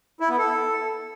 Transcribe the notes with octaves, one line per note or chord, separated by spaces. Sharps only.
E4
B3
A4